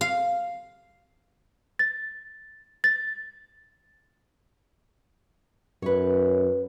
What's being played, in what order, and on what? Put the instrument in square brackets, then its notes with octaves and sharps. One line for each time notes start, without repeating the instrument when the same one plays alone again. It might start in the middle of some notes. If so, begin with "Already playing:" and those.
[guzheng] F5
[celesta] A6
A6
[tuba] F#2 [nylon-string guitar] B4 C#5